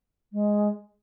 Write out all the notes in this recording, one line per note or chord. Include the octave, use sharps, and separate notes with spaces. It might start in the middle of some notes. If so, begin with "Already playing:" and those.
G#3